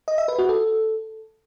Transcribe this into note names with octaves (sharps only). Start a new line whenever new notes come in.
D#5
E5
B4
F#4
A4